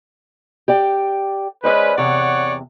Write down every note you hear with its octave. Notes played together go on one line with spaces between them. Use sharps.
G4 D5 G5
G#3 C#4 B4 C5 D5 D#5
E2 C3 C#5 D5 F#5